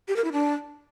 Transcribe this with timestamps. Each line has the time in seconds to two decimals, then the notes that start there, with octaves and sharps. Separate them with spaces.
0.08 G4
0.16 A#4
0.24 E4
0.33 D4